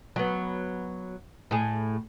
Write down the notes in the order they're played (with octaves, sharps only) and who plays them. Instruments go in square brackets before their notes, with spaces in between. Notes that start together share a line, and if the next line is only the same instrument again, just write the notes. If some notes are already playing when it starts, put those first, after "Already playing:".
[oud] F#3 B3
A2 G#4